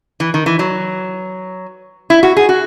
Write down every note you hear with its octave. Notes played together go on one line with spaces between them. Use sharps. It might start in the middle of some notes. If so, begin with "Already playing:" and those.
E3
D#3
E3
F#3
E4
F#4
G#4
F#4